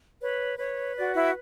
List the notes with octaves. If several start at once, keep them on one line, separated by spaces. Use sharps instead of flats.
B4 C#5
B4 C#5
F#4 D5
E4 E5